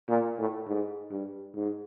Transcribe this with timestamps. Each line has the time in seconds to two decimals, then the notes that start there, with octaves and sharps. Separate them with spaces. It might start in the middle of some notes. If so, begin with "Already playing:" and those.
0.09 A#2
0.38 A2
0.67 G#2
1.11 G2
1.55 G#2